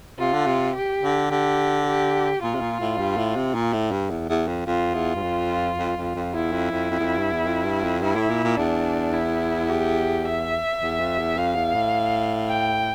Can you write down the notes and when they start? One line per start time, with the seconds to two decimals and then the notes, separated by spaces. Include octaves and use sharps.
0.19 C3 F4
0.33 D3
0.46 C3
0.76 G4
1.03 D3
1.31 D3 G4
1.87 G4
2.43 A#2 F4
2.55 C3
2.61 A#2
2.80 A2
2.98 G2
3.17 A2
3.36 C3
3.54 A#2
3.73 A2
3.92 G2
4.10 E2
4.29 E2
4.48 F2
4.67 F2 F4
4.94 E2
5.16 G2
5.22 F2
5.78 F2
5.97 F2
6.15 F2
6.34 E2 E4
6.52 F2
6.71 F2
6.90 F2
7.00 E2
7.04 F2
7.18 G2
7.32 E2
7.46 F2
7.65 G2
7.83 F2
8.02 G2 E4
8.16 A2
8.29 A#2
8.44 A#2
8.57 E2 D4
9.13 E4
9.69 G4
10.25 E5
10.81 E2
11.00 F2
11.19 E2
11.37 F2 F5
11.56 E2
11.74 A2
12.49 G5